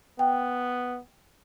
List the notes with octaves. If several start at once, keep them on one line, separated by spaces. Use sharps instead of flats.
B3 G5